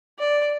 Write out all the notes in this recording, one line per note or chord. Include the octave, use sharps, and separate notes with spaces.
D5